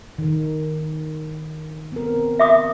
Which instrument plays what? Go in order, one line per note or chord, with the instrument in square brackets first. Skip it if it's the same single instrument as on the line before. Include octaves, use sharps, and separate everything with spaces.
[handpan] D#3 A#4
B3 C4 A#4
[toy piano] E5 D6 D#6